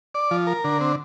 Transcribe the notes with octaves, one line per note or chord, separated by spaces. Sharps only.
D5
F3
A#4
D3
C4